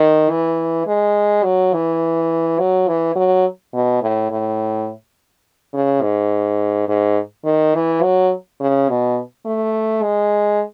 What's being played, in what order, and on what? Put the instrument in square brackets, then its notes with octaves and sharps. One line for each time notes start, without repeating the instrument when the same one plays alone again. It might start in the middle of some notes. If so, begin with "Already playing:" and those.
Already playing: [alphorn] D#3
E3
G#3
F#3
E3
F#3
E3
F#3
B2
A2
A2
C#3
G#2
G#2
D#3
E3
F#3
C#3
B2
A3
G#3